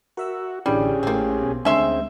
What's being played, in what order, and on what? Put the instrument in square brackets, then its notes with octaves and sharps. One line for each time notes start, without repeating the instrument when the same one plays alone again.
[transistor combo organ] F#4 [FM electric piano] A#4 E5 E6
[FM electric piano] A1 D3 E3 [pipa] G3 [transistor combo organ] C#4 G4 G#4
[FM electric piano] A1 A2 [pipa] A#3 C4
[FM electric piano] B1 B2
[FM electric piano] D2 D3 [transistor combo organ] G#3 C4 [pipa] C#4 E5 C6